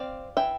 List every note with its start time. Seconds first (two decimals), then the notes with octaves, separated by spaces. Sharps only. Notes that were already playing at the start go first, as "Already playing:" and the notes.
Already playing: C4 D5 F5
0.37 E3 E5 G5